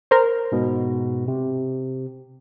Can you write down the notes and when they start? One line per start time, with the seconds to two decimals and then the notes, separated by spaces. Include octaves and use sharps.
0.11 A#4 C5
0.52 G#2 B2
1.28 C3